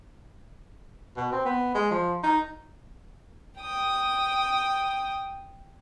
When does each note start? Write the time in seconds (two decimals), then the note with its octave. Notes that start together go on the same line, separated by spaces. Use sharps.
1.17 B2
1.32 C4
1.45 B3
1.75 G#3
1.91 F3
2.23 D#4
3.58 G5 D#6